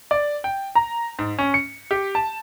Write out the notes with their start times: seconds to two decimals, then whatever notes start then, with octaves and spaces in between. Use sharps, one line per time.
0.11 D5
0.44 G5
0.75 A#5
1.19 G#2
1.39 C#4
1.54 C#7
1.91 G4
2.15 A5